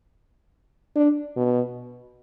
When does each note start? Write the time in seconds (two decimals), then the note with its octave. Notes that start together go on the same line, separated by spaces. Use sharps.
0.96 D4
1.37 B2